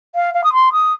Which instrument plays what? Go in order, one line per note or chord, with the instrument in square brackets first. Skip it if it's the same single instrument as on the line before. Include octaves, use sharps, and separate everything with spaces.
[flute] F5
F5
D#6
C6
D#6